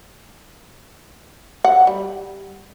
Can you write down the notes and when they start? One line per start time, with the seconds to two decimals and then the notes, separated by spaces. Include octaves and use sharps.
1.65 F#5
1.87 G3